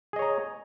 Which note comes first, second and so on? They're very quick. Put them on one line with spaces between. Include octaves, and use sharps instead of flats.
G#4 D#5 C#5 A#5